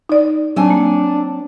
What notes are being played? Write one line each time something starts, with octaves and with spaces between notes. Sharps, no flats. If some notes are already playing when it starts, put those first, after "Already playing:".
D#4 D5
F#3 C4 D4 G#5
A#3